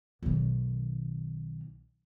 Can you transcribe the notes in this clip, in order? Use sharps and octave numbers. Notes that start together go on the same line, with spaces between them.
B1 D#3